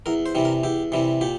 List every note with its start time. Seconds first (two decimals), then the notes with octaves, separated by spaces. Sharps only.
0.06 E2 A#4
0.26 C5
0.35 C3 E3 G3
0.45 A#4
0.64 E2 G4
0.92 C3 E3 G3
1.21 A#2 G4